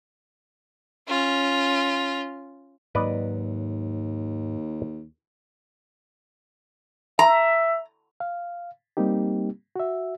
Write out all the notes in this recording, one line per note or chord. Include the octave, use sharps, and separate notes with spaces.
C#4 F4
D#2 G#2 F#3 B4 D5 D#5
E5 A#5
F5
G3 A#3 C4 D#4 G4
F#4 E5